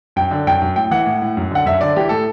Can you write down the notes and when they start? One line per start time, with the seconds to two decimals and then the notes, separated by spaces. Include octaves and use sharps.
0.16 F#2 G5
0.31 D3
0.47 F#2 G5
0.61 F#2
0.76 A2 G5
0.91 E3 F#5
1.06 A2
1.22 A2
1.37 F#2
1.51 D3 F#5
1.66 F#2 E5
1.81 D3 D5
1.96 E3 G4
2.09 A2 A4